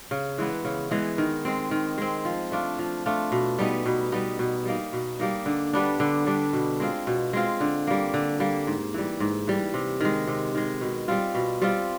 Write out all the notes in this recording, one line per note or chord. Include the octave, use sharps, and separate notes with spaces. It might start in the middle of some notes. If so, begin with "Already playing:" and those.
C#3
E3 G#3 B3
C#3
E3 G#3 B3
D#3
G#3 C4
D#3
G#3 C4
F3
A3 D4 F4
F3
A3 D4 F4
B2
G3 B3 D#4
B2
G3 B3 D#4
B2
G3 A#3 D#4
B2
G3 A#3 D#4
D3
G3 B3 D4
D3
G3 B3 D4
B2
G#3 C4 F4
B2
G#3 C4 F4
D3
G3 A#3
D3
G3 A#3
G#2
E3 G3
G#2
E3 G3
C3
D#3 G#3
C3
D#3 G#3
B2
G3 C4 F4
B2
G3 C4 F4